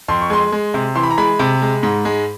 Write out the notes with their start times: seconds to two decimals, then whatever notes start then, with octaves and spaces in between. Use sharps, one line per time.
0.08 F2 C6
0.21 C#6
0.30 G#3 C6
0.52 G#3
0.74 C3
0.95 E3 C6
1.03 B5
1.11 A#5
1.18 G#3 B5
1.39 C3
1.62 G#3
1.83 G#2
2.05 G#3